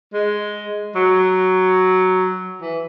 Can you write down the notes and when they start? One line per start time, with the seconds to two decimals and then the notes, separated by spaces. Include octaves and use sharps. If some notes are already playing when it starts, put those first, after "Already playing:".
0.14 G#3
0.95 F#3
2.61 E3